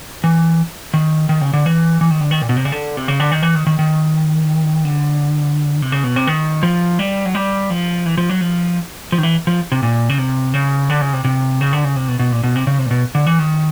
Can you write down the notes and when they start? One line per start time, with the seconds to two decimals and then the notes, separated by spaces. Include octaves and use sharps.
0.24 E3
0.94 D#3
1.29 D#3
1.41 C#3
1.53 D3
1.66 E3
2.01 E3
2.11 D#3
2.21 D3
2.31 D#3
2.42 A#2
2.49 B2
2.57 C3
2.65 C#3
2.72 D3
2.97 C3
3.08 C#3
3.20 D3
3.32 D#3
3.43 E3
3.55 D#3
3.67 D#3
3.79 D#3
4.85 D3
5.82 C3
5.92 C#3
6.04 B2
6.16 C3
6.27 D#3
6.63 F3
6.99 G3
7.25 F#3
7.35 G3
7.70 F3
8.06 E3
8.18 F3
8.29 F#3
8.41 F3
9.12 F3
9.18 D#3
9.23 E3
9.47 F3
9.72 C3
9.83 A#2
10.09 C#3
10.18 C3
10.54 C#3
10.90 D3
11.01 C#3
11.13 C3
11.24 C3
11.61 C#3
11.73 D3
11.84 C#3
11.96 C3
12.08 B2
12.19 B2
12.32 A#2
12.43 B2
12.56 C3
12.67 C#3
12.79 C3
12.86 A#2
12.91 B2
13.15 D3
13.27 E3
13.39 D#3